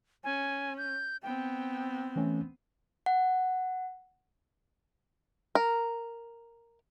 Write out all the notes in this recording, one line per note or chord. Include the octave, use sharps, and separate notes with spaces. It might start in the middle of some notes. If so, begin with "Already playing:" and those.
C#4 G#5
G6
B3 C4 G5
E3 A3 C#4
F#5
A#4